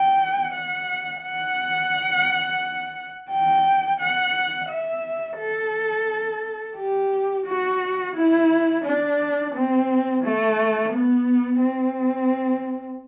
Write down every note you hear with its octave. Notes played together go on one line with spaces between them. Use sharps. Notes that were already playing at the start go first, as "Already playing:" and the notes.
Already playing: G5
F#5
F#5
G5
F#5
E5
A4
G4
F#4
E4
D4
C4
A3
B3
C4